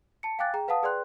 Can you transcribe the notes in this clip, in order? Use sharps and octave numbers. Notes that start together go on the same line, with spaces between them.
A5 C#7
F5 G5 G#5 D6 F#6 A6
G#4 G5 A#5
B4 F5 F#5 A5 D#6
G#4 B4 D5 G5 C6 F#6